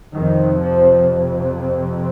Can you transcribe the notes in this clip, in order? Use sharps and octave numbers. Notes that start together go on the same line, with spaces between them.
F2 C3 D#3
F3